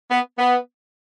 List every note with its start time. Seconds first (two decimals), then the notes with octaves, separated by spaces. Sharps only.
0.11 B3
0.39 B3